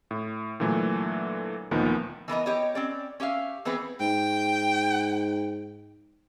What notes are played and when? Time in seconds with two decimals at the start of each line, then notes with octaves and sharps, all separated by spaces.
0.11 A2
0.60 A#2 D3 E3 F#3 A3
1.71 D2 A#2 D#3 F3 A#3 B3
2.28 E3 B3 A#4 D#5
2.46 G4 C#5 D#5
2.75 C4 C#4 D5
3.20 C#4 G4 E5 F5
3.65 E3 B3 C4 G#4 B4
4.00 G#2 G5